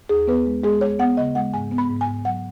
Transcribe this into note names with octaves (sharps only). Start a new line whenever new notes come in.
D#2 G#4
B3 B4
G#3
G#3 G#4
G#3 C#5
B3 F#5
C#3 D#5
G#3 F#5
G#2 G#5
B3
B5
G#2
G#5
G#2
F#3 F#5